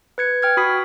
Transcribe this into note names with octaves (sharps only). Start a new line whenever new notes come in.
B4 G#6 C#7
G5 F6 G#6
F#4 B5 D#6 B6